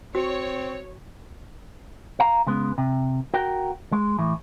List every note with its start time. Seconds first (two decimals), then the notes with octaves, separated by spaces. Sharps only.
0.15 C4 F#4 C#5
2.20 F5 A#5
2.47 C#3 G#3 B3
2.78 C3
3.34 F#4 A#4 G5
3.92 G#3
4.19 A2 E3